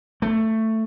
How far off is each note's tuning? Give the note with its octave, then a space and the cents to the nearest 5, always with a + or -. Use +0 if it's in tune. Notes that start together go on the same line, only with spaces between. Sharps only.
A3 +10